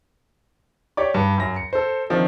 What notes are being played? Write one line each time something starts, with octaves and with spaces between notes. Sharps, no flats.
G4 C#5 D5 D6
G2
F#2 A#6
C#7
A4 C5
D#3 F3 C4 D4